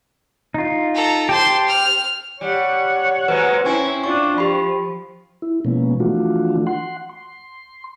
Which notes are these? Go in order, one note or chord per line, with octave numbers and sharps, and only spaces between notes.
D#4 F4
A4 A#5
G4 C5 A5 C6
F6
G3 C#5 F#5
F#3 G#3 A#3 B4 C5
C4 C#4 E4 G#5 C#6
D4 F4 C#6
F3 G4 B5
E4
B2 F3 G#3 A#3 B3 C#4
E3 F3 A3 D4 F4 F#4
F#5 C6
C6